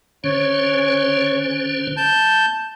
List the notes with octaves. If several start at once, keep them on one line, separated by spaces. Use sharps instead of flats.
D3 C#4 C5 C#5
A5 G6